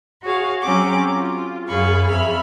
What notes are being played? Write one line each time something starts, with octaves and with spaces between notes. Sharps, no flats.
F#4 G#4 C#5 F5
F#3 C4 C#4 D6
F4
F#2 G#4 F5 B5 C#6
F2 E5 B5 F6